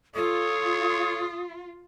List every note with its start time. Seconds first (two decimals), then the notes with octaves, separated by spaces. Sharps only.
0.15 F4 A4 C#5 D#6